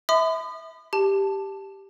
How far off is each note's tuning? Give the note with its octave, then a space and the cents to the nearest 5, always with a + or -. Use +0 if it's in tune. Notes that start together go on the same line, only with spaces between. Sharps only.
E5 -25 B5 +40 D#6 -35
G4 +0 A5 +0